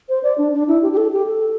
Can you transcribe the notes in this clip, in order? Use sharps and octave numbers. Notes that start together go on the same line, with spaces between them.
C5
D5
D4
D4
E4
G4
G4
A4
G4
A4